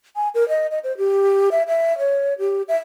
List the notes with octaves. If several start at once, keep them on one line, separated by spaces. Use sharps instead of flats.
G#5
A#4
D#5
D#5
C5
G4
E5
E5
C#5
G4
E5